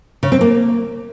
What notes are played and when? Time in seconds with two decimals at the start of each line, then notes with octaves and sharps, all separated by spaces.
0.23 C#3
0.32 C4
0.41 A#3